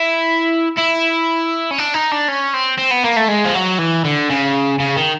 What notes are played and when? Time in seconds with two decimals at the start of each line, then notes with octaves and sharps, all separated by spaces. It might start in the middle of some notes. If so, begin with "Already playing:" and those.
Already playing: E4
0.77 E4
1.71 C#4
1.78 D4
1.94 D#4
2.11 D4
2.28 C#4
2.53 C4
2.78 C4
2.91 B3
3.04 A#3
3.16 A3
3.28 G#3
3.45 F3
3.54 F#3
3.78 E3
4.05 D3
4.29 C#3
4.80 C#3
4.97 D#3